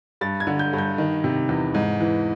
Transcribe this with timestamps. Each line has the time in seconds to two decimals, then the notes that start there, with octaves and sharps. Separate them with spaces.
0.21 G2 A6
0.40 G#6
0.47 D3
0.59 G6
0.73 G2
0.78 G6
0.98 D#3
1.24 C3
1.49 E2
1.74 G#2
2.00 E3